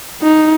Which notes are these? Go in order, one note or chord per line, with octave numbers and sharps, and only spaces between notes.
D#4